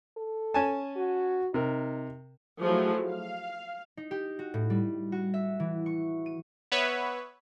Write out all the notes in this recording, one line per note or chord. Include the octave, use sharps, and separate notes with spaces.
A4
C#4 G#5 A5
F#4
C3 D#4 A#4
F3 F#3 A3 E4 G#4
F5
D#4
G4
F#4
A2
G3
F#4
E5
E3
C#6
D#7
B3 B4 C#5 E5